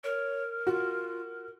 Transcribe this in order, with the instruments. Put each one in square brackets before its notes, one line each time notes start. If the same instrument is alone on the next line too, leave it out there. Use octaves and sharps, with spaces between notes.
[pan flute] A#4 [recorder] C#5
[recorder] F4 [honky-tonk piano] F#4